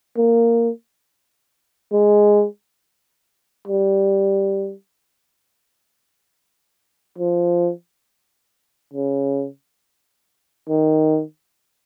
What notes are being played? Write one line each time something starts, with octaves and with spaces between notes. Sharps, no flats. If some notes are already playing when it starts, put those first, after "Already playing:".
A#3
G#3
G3
F3
C#3
D#3